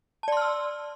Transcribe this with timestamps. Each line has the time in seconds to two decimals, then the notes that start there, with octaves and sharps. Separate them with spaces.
0.23 A5
0.28 D5
0.32 C6
0.37 F6
0.41 E6